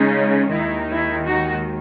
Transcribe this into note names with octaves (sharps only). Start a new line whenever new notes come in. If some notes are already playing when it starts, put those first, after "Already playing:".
Already playing: C#3 G#3 C#4 D#4
D#2 D#3 G#3 D#4 E4
E4
D#4 F#4